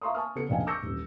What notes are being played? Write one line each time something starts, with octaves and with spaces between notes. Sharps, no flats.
E5 F5 A#5 C6 C#6 D#6
G#5 A5 C#6 D#6 F6
C#3 B3 A4 C#7
F1 A#1 D#5 F5 G5 G#5
C#6 D6 E6 G6 A#6 C#7
D#1 A1